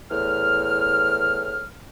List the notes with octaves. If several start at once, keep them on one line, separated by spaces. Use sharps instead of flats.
E2 A2 F6